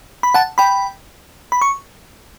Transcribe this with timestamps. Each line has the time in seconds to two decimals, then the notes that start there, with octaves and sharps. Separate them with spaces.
0.23 B5
0.34 F#5 A5
0.58 G5 B5
1.52 B5
1.62 C#6